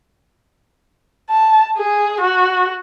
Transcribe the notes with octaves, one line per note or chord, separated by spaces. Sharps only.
A5
G#4
F#4